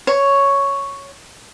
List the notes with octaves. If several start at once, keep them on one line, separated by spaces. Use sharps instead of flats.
C#5